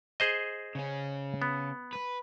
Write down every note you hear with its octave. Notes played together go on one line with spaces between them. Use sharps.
G#4 C5 D#5
C#3 C#4
B3
B4